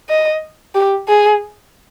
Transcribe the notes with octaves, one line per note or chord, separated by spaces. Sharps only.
D#5
G4
G#4